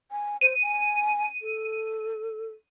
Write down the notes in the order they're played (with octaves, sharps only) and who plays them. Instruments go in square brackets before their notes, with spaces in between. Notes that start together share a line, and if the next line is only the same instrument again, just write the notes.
[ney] G#5
[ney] C5 [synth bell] D#7
[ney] G#5
A4